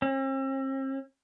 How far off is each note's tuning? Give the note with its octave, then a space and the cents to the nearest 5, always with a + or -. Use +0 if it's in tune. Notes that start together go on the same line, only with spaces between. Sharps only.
C4 +45